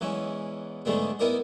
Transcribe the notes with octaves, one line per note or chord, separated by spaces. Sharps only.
E2 E3 G#3 C#4
G#2 D3 G#3 A3 B3 D4
B3 D#4 E4 A#4 D5 D#5